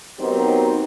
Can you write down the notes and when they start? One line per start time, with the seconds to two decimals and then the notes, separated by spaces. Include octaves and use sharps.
0.19 D#3 F#3 B3 C4 D#4 G4